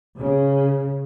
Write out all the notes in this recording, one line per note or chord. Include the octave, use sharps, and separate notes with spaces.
C#3